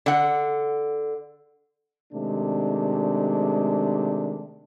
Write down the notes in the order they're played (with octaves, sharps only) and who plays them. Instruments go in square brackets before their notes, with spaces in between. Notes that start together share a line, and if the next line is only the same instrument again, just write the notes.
[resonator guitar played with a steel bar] D3 F#5
[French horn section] C3 D#3 G#3 A3 D4